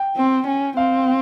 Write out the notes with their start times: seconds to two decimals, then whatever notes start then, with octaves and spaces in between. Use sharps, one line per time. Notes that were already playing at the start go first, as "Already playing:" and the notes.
Already playing: G5
0.16 C4
0.47 C#4
0.76 C4 F5